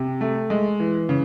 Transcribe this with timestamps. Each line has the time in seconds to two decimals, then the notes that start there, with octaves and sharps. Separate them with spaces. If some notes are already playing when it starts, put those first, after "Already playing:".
Already playing: C3
0.21 A3
0.50 G#3
0.80 E3
1.09 C#3